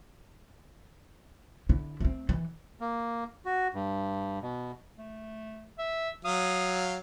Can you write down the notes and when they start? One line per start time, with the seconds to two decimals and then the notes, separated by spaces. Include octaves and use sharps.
1.69 D3 E4
2.00 A3 C4
2.29 E3
2.81 A#3
3.45 F#4
3.74 G2
4.42 B2
4.98 A3
5.78 E5
6.25 F#3 F5 D#6